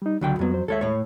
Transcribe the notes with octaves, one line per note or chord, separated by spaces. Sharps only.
G3 D#4
C#2 D3 F#3 G5
F2 F#3 G3 B3
C5
D#2 G#3 A4 C#5 E5
A2 C#5